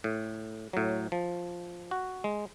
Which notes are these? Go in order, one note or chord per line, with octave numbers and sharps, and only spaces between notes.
A2
A2 F#3
F3
F#4
G#3